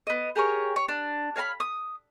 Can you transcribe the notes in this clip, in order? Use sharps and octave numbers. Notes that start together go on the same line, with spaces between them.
B3 D#5
G4 G#4 A#4 C#5
C#5
D4
C#5 F5 A5 B5
D#6